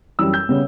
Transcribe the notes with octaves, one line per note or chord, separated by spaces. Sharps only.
F#2 E3 G3 E6
G6
C#3 G3 B3